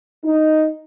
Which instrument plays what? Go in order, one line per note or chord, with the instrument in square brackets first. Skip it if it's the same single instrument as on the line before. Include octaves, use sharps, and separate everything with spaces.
[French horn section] D#4